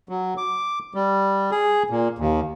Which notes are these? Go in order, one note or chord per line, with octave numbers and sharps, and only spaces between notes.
F#3
D6
G3
G#4
A#2
D#2